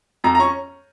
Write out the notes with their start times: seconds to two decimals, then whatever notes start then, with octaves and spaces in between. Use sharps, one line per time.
0.24 F2 A#5
0.35 A#5
0.39 C#4 C#6